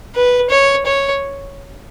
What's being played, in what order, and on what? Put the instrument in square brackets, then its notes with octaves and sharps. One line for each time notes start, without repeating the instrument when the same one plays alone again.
[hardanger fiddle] B4
C#5
C#5